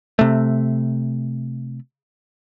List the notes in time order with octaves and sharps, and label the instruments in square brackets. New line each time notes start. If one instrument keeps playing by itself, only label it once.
[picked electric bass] C3 A3